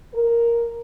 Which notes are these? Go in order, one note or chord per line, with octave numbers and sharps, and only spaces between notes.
A#4